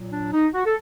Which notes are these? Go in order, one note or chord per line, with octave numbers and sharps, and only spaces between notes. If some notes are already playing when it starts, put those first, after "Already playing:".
Already playing: A#2 F#3
D4
D#4
F#4
A4